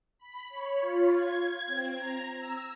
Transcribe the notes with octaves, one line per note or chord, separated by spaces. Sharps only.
B5
C#5
F4
G#6
C4
A#5
E6